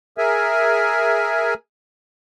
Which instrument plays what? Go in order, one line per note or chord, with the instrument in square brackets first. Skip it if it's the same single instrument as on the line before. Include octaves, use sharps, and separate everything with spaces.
[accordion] G#4 A#4 E5 G#5